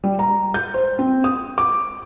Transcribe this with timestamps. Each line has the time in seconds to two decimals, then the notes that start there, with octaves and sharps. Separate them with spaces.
0.04 G3
0.19 A#5
0.54 G6
0.74 C5
0.99 C4
1.24 D#6
1.58 D6